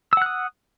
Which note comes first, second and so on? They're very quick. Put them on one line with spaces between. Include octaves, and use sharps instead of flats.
E6 F#5 F#6 D#6